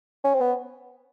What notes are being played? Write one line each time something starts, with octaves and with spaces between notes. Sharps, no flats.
C#4
C4
B3